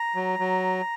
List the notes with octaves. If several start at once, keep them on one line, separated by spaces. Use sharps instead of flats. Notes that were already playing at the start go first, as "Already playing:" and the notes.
Already playing: A#5
F#3
F#3